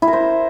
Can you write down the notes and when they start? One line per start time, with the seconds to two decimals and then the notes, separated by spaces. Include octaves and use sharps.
0.02 E4
0.08 A#4
0.13 C5